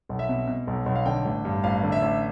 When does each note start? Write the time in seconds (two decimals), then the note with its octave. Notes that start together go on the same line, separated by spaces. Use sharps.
0.09 B1
0.19 E5
0.29 B2
0.47 B2
0.67 B1
0.86 B1
0.95 F5
1.06 D3 G5
1.25 A1
1.45 G2
1.64 A1 F5
1.83 D3
1.92 E5
2.02 A1